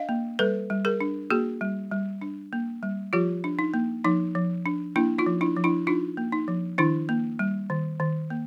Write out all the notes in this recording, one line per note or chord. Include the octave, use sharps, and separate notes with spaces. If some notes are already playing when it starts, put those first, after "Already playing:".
Already playing: D4 D#5 F5
A#3
G3 A4 B4
G3
G#4 A#4
D4
A#3 F#4 G#4
G3
G3
D4
A#3
G3
F3 F4 G4
D4
D#4
A#3
F3 D#4
F3
D4
A#3 D4 E4
D#4 F4
F3
D4 E4
F3
D4 E4
D4 D#4 F4
A#3
D#4
F3
D#3 D4 E4
A#3
G3
D#3
D#3
A#3